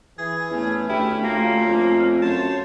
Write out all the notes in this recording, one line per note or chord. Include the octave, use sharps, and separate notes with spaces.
E3 G#4
E2 A3 C#4
D2 E4 G4
D2 A#3 F4
F2
F#2 C5 C#5 A5